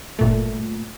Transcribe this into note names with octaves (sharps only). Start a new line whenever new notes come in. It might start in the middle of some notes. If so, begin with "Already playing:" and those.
G1 A#2 A3